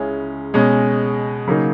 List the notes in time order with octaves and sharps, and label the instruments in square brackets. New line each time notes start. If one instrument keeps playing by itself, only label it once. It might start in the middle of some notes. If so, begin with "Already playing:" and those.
Already playing: [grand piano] C#2 C#3 G#3 C#4 E4
B2 G#3 C#4
C#3 F#3 A#3 D#4